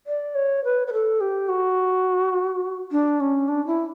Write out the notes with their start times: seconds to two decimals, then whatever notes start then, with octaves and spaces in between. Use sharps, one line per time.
0.07 D5
0.35 C#5
0.65 B4
0.87 B4
0.93 A4
1.21 G4
1.49 F#4
2.92 D4
3.20 C#4
3.48 D4
3.67 E4